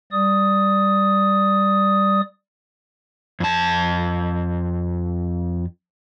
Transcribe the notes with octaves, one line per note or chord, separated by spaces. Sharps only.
G3 D5 D#6
F2 A5